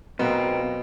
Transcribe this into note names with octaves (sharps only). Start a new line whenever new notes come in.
B1 B2 A#3 C4